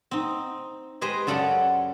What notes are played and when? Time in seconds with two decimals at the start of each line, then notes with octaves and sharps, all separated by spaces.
0.11 C4 D#4
1.01 G#3 G4 G#4 B4 C5 D#5
1.27 F#2 C#3 A4 D5 F#5 G5